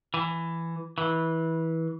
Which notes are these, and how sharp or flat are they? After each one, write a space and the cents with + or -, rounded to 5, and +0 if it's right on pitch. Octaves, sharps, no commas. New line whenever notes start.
E3 +10
E3 -20